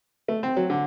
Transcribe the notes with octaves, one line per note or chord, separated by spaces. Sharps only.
A3
C4
F#3
D3